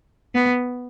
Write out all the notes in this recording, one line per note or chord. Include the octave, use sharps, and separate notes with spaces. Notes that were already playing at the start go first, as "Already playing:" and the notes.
B3